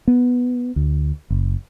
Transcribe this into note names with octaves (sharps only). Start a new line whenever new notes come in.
B3
D2
F#1